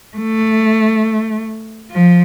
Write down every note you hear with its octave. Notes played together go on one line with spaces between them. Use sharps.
A3
F3